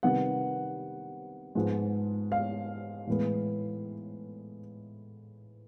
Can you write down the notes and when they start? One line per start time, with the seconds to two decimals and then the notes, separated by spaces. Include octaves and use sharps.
0.03 C3 D#3 G3 B3 F#5
1.55 G#2 F3 G#3 B3
2.32 F5
3.07 A2 E3 G#3 B3